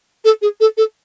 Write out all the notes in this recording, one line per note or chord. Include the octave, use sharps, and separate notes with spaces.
A4
G#4
A4
A4